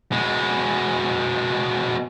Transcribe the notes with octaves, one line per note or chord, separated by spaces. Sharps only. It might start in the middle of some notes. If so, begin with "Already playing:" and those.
B2 G#3